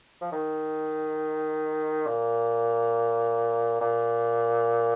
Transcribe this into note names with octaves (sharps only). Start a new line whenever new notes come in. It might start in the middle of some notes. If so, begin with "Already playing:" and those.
F3
D#3
A#2
A#2